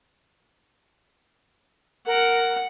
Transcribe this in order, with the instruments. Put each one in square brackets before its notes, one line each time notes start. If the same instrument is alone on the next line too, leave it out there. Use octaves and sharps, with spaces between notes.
[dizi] A#4 [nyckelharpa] F#5